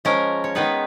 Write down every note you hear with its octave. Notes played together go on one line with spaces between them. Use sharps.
F3 G#3 C#4 A#4
C#5
D#3 G#3 B3 D#4 B4